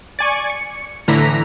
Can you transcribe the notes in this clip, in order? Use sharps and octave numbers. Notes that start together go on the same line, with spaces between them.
D5 G#5 C#6
C#7
A2 D3 E3 A#5 B6